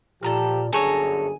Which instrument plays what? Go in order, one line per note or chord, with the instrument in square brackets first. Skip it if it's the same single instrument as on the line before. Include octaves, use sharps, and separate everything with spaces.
[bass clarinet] A#2 [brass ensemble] F3 G4 [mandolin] A4 A#5 F6
[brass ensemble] G1 F#2 D3 [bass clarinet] G#4 [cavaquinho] A4 C#5 A#5 [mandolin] G#5